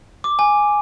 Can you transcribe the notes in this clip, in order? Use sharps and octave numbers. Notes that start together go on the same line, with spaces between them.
D6
G#5